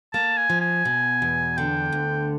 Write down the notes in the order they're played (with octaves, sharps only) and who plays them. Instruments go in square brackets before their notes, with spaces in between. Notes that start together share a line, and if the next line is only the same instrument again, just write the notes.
[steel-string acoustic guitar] A#3 [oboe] A5
[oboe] G#5
[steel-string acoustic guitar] F3
[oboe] G#5
[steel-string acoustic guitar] B2
E2
[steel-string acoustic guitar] D3 [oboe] G5
[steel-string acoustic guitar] D2